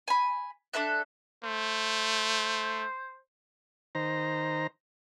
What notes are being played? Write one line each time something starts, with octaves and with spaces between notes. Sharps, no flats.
G#5 B5
D4 A4 E5 F#6
A3 C5
D#3 C5 A#5